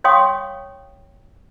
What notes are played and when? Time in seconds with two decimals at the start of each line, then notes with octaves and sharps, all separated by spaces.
0.04 C#5 F5 G5 C6 C#6 D#6